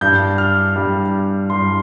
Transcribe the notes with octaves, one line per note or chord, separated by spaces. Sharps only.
G2 G3 D4 G6
F6
G2 G3 D4
G2 G3 D4 C6